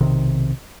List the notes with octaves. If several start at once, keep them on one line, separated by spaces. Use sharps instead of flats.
B1 C3 D#3